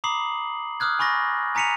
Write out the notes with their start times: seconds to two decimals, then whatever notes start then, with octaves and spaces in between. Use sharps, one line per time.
0.04 A#5 B5 D6 D#6 C7 F#7
0.80 D6 D#6 F6 F#6 G#6
0.99 G#5 B5 C#6 A6 A#6
1.55 G#5 A#5 B6 C#7 D#7 F7